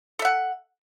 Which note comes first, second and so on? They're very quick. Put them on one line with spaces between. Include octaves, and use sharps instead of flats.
A4 E5 F#5